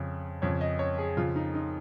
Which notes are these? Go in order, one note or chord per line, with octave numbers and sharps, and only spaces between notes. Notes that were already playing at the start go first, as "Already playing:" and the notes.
Already playing: F2 C#3
F2 C#3 C#5
D#5
C#5
G#4
F2 C#3 F4
D#4
D#4